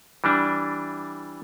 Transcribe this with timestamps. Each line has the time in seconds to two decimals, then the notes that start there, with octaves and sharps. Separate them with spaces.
0.24 E3 G3 D4